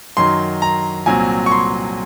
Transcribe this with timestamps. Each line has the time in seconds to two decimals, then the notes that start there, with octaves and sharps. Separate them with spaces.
0.17 F#2 D#3 F#3 C6
0.62 A#5
1.06 C2 A#2 F#3 C4 G#5
1.46 C#6
1.51 C6